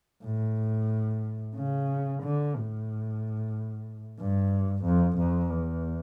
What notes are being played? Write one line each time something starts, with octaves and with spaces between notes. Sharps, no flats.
A2
C#3
D3
A2
G2
F2
F2
E2